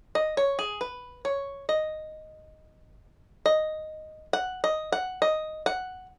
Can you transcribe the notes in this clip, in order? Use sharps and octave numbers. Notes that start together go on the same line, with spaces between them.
D#5
C#5
G#4
B4
C#5
D#5
D#5
F#5
D#5
F#5
D#5
F#5